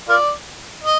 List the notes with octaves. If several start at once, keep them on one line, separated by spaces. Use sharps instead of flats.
F4 A#4 D5
D#5